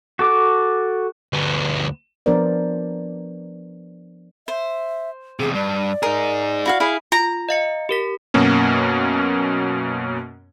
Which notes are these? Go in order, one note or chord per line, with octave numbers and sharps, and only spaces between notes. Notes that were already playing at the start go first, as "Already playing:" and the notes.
F#4 A4 D6
D2 B3
F3 B3 D4 A#4 C5 D5
C5 E5
E2 C3 G#4
G2 D5
D#4 G#4 A#4
E4 F#4 F5
E4 G#4 F5
F4 A#5
D#5 F5 C#7
G4 A#4 B6
F#2 B2 A#3 C#4